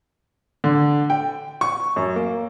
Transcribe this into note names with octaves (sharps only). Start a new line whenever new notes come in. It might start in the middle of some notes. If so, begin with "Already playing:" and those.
D3
G5
C#6
F#2
A#3